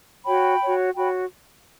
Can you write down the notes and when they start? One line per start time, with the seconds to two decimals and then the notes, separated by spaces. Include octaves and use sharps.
0.24 F#4 C#5 G5 B5
0.60 F#4 C#5
0.95 F#4 C#5 G5 B5